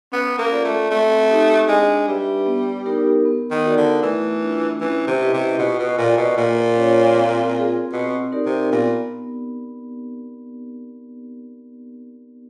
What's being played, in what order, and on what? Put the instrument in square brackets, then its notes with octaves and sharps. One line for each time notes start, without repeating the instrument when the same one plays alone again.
[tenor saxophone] B3 [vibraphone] C#4
[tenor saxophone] A#3
[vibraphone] F4 A4 D5 F#5
[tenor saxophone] A3
[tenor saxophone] A3 [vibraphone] C4
[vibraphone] D#4 G4
[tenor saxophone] G#3 [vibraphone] D4
[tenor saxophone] G3 [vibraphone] G4 B4 E5
[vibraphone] B3
D#4 G4 A#4
B3
[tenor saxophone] D#3
[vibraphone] D#4 F#4 A#4 D5
[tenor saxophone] D3
[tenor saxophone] E3 [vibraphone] A3
[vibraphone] D4 F4
[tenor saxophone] E3 [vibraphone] C#4
[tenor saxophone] C3
[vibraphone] E4 G4 B4 D#5
[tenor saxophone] C3
[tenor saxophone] B2 [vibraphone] F4
[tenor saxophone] B2
[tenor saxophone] A#2 [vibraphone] A4 D5
[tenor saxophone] B2
[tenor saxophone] A#2 [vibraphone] A#3
[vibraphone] C#4 F4 A#4 C#5
C4
F4 G#4
[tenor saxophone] B2 [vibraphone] C4
[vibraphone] D#4 G4 A#4 D5
[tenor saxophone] C3
[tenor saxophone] A#2 [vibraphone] B3